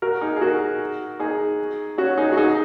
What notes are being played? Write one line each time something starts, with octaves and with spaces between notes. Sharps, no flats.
F#4 A#4
D#4 G#4
G#4
F#4 A#4
D#4 G#4
C#4 F#4
D#4 G#4
F#4
D#4 G#4